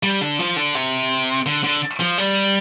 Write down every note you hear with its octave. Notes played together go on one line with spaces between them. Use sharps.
G3
D3
F3
D3
C3
D3
D3
F3
G3